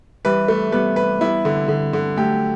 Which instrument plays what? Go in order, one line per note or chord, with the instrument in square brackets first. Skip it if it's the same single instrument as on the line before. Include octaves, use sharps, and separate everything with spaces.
[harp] E3 G3 [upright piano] B4
[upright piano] A3
[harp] G3 B3 [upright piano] B4
[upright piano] B4
[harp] G3 B3 [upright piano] E4
[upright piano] D3
D3
D3
[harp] F#3 A3 [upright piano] G4